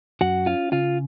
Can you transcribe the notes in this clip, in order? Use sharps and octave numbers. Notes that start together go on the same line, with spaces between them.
F#2 F#4 F#5
C#4 F4 F5
C#3 F4 F5